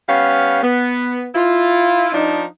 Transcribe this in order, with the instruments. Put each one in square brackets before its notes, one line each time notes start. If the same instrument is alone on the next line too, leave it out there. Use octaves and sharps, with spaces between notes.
[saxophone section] G3 B3 C#4 F5
B3
E4 F4
F3 D4 D#4